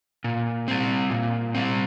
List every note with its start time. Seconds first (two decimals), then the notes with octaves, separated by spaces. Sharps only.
0.24 A#2
0.68 G3 C4
1.10 A#2
1.55 G3 C4